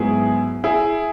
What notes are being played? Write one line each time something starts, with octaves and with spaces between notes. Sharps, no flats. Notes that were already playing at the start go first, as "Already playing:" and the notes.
Already playing: G#2 F#3 B3 E4 G#4
E4 G#4